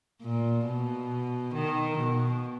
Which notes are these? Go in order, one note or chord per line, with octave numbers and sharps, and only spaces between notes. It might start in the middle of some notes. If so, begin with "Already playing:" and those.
A#2
B2
D#3
B2